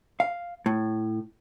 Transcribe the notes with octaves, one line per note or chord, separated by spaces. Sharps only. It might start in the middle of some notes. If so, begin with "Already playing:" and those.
F5
A2